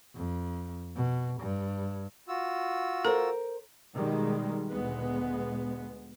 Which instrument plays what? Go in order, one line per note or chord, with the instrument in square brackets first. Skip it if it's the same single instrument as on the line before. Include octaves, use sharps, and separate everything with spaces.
[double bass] F2
B2
G2
[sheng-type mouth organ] F4 F#4 E6
[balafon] A4 [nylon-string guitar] A#4 C5
[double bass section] B2 D#3 G3 G#3
D2 A#2 G#3 B3